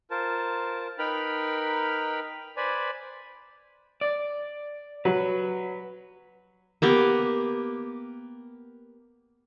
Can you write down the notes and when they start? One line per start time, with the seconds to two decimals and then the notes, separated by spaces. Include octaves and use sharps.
0.11 F4 A#4 C5 A5
0.99 D#4 A#4 B4 G5 B5 F6
2.57 B4 C5 D5 G#5 B5
4.01 D5
5.05 F#3 B4
6.82 A#3 B3 G4